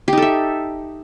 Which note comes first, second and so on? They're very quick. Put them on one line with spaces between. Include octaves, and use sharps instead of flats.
G4 D#4 A4 E5